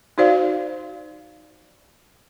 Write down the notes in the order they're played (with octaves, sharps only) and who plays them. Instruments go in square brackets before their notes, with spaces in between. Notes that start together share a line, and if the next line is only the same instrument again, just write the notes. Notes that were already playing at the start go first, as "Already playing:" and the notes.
[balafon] D#4 F#4 C5 D5 F5